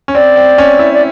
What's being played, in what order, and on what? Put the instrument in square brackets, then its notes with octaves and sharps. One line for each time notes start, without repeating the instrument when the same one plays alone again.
[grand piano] C#4
[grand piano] C4 [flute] D5
[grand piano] C4
C#4
E4
[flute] D5